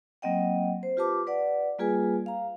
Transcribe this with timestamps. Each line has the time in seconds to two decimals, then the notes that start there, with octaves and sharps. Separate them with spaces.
0.22 F#3 A#3 C4 D#5 F#5 G5
0.83 C5
0.97 F4 G4 B4 A5 D6
1.27 B4 D5 F#5
1.79 G3 A#3 F4 G#4 B4 G#5
2.26 F5 A#5